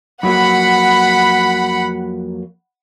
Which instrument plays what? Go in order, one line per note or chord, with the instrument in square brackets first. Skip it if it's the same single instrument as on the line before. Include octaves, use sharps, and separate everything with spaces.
[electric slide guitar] F2 F#3 A#3 [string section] F#5 B5